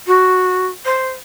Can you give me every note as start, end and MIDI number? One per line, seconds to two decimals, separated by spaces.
0.07 0.66 66
0.85 1.09 72